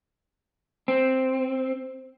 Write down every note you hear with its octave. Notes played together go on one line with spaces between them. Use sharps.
C4